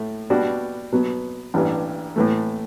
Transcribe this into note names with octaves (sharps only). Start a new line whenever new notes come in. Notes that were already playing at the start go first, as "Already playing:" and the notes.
Already playing: A2 A3
B2 G3 D4 F#4
B2 F#3 B3
A1 G2 E3 G3 D4
A2 E3 A3